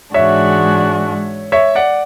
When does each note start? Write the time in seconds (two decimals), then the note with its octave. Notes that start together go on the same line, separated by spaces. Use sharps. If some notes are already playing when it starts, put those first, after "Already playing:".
0.14 G#2 E3 G#3 D4 F#4 C#5 E5
1.52 C#5 E5
1.75 D5 F#5